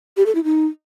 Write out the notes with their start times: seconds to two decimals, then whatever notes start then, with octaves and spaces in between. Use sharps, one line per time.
0.17 G4
0.26 A4
0.35 E4
0.44 D#4